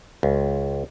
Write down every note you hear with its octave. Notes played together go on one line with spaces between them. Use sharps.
C#2